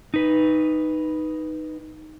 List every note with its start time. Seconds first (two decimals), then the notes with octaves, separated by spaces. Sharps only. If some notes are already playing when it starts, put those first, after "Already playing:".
0.14 D#4 B4